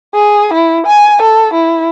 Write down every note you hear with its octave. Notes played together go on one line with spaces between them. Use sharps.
G#4
E4
G#5
A4
E4